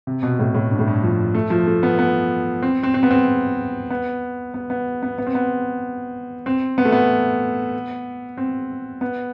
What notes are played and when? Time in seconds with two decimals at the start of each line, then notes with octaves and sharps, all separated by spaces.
0.07 C3
0.23 B2
0.39 A2
0.55 A2
0.71 G2
0.79 A2
0.87 G2
1.03 F3
1.35 A3
1.50 F3
1.67 A3
1.83 B3
1.99 B3
2.62 C4
2.83 C4
2.94 C4
3.03 B3
3.11 C4
3.90 B3
4.54 B3
4.70 B3
5.03 B3
5.18 B3
5.27 C4
5.35 B3
6.46 C4
6.78 B3
6.85 A3
6.92 B3
8.38 C4
9.01 B3